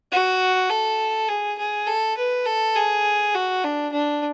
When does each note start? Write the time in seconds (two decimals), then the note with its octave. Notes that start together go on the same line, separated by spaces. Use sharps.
0.12 F#4
0.70 A4
1.28 G#4
1.58 G#4
1.87 A4
2.17 B4
2.46 A4
2.75 G#4
3.35 F#4
3.64 D4
3.92 D4